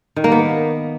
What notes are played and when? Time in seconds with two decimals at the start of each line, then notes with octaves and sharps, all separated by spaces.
0.16 D#3
0.24 A#3
0.32 B3